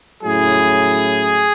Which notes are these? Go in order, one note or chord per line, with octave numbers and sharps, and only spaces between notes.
A2 F#3 C#4 E4 G#4